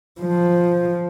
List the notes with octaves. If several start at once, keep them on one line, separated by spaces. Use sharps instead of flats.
F3